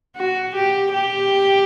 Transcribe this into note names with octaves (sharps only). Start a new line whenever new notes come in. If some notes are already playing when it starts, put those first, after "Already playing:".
F#4
G4
G4